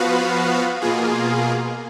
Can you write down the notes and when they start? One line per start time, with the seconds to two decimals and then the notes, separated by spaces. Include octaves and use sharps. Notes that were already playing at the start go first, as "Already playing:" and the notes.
Already playing: F3 B3 F#4 B4 F5
0.81 B2 A#3 F4 G#4